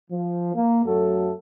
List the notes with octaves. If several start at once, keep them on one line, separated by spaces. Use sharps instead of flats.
F3
A#3
F#2 F#3 A3 F#4 A4